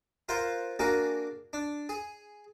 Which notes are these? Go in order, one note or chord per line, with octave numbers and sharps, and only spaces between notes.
F4 A#4 C5 F5 F#5
A#3 D4 F#4 G#4 A#4
D4
G#4